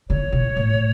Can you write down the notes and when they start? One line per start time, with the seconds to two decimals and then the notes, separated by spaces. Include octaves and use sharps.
0.09 D3 C#5
0.33 B2
0.57 A2